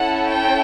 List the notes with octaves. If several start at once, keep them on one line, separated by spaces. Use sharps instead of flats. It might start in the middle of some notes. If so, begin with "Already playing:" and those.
Already playing: C#4 E4 A4 F#5
G5